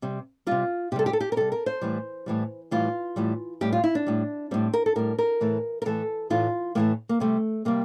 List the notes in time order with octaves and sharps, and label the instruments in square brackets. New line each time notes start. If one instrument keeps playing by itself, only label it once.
[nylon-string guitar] C3 G3
C3 G3 F4
C3 G4
G3 A4
G4
A4
G4
A#4
C3 G3 A4
A#4
C5
A2 E3 G3
A2 E3 G3
A2 E3 G3 F4
A2 E3 G3
A2 G3 G4
F4
E4
D4
A2 G3
A2 G3 C4
A#4
A4
A2 G3 A#4
A#4
A2 E3 A3
A#4
A2 E3 A3 A4
A2 E3 A3 F4
A2 E3 A3 A#3
A#3
C3 G3 A3
C3 G3 A#3